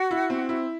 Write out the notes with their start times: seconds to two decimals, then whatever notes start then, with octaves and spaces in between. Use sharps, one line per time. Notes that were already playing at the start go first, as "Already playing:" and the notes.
Already playing: F#4
0.11 E4
0.30 C4
0.49 E4